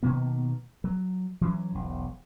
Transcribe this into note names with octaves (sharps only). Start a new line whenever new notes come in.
B2 D#3 A#3 B3
F#3
E3 F#3 C#4
E1 B1